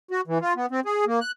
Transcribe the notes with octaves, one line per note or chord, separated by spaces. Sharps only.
F#4
E3
F4
B3
C4
G#4
A#3
F#6